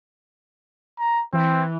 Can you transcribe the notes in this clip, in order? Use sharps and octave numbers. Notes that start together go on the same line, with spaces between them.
A#5
E3 C4